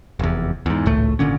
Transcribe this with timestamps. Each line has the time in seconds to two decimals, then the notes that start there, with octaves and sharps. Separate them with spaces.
0.19 F1 E2
0.66 E2 G#2
0.86 G#1 C#2 A2 A3
1.19 G#1 A#2 D3 C#4